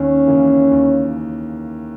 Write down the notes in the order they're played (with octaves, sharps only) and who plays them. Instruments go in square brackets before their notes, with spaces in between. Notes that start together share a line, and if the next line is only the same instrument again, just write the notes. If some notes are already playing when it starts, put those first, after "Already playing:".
Already playing: [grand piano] D#2 [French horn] C#4
[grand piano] C#3 E3 A#3
D#2